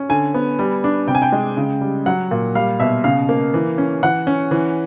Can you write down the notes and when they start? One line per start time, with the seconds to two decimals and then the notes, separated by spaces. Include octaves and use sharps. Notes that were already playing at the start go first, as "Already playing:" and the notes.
Already playing: C#4
0.09 D3 G#5
0.34 B3
0.59 G3
0.84 D4
1.07 C3 G5
1.15 G#5
1.22 G5
1.32 G#3
1.57 C#3
1.81 G3
2.06 F#3 F#5
2.31 A#2
2.55 G3 F5
2.80 B2 E5
3.04 C#3 F5
3.29 A#3
3.54 E3
3.78 C#4
4.03 E3 F#5
4.27 C#4
4.51 E3